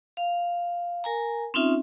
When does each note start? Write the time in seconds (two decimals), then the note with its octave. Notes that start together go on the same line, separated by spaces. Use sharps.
0.17 F5
1.04 A#4 G#5 A#5
1.54 C4 C#4 D#4 F4 E5